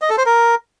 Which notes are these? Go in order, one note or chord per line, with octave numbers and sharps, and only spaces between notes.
D#5
A4
C5
A#4